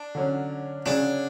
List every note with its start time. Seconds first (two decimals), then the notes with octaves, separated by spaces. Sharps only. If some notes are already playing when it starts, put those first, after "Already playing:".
Already playing: D4
0.15 D3 F#3 C#4
0.86 C#3 F#3 C#4 D4 G#4 C#5